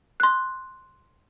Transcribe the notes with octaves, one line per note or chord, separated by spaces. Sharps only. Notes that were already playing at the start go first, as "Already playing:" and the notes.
C6 F#6